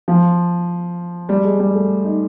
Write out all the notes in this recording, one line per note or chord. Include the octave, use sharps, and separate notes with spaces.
F3
G3
G#3
G3
A3
D#4